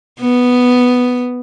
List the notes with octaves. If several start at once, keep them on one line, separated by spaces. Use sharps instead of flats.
B3